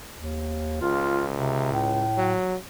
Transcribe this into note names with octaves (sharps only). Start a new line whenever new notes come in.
D#2
C#2 F4
C3
A2
F#3